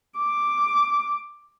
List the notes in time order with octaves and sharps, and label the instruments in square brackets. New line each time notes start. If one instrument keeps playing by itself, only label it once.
[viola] D6